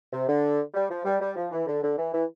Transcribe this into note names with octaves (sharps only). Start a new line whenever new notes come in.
C3
D3
G3
F3
G3
G3
F3
E3
D3
D3
E3
E3